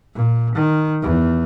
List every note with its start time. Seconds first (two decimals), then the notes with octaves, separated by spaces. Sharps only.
0.15 A#2
0.55 D#3
1.02 E2